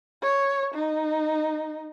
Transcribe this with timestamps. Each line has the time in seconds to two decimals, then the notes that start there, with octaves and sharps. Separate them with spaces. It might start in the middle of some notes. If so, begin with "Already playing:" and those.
0.22 C#5
0.74 D#4